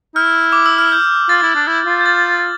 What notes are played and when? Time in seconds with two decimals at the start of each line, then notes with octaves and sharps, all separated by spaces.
0.15 E4 F6
0.52 D6
0.66 E6
0.78 F6
0.92 G6
1.29 F4 A6
1.43 E4
1.55 D4
1.67 E4
1.87 F4
2.01 G6
2.06 A6